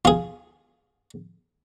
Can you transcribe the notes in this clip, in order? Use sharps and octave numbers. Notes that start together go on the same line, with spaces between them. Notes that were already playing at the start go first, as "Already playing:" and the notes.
F4 G#4